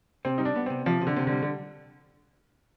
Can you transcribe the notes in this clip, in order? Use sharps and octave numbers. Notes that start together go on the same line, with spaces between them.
C3 C4
G3 D#4
D4
B3
C3 C4
C3 F3
C3
D3
C3
D3
G3
D3